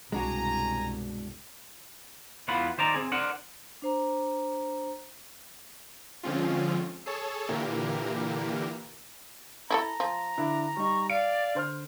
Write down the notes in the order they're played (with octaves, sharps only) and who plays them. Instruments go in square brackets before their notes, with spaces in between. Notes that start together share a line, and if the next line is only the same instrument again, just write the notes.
[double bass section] C2 G2 B2 [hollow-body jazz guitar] G#3 D4 F#4 [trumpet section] G#5 A#5
[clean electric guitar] E2 E3 F4 F#5 B5
D#3 C5 D5 A#5
C4 G#4
D4 A#4 C5 F#5
[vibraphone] D4 C5 A#5
[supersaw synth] D3 F3 G#3 C4 C#4 F4
G#4 A4 C#5 A5
A#2 D3 E3 A#3 G4 A#4
[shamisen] E4 G#4 A4 [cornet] A#5
[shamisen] F3
[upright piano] D3 D4 E4
[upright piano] G3 D#4 [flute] C#6
[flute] D5 [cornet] F5 [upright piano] D7
[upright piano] D3 C5 F6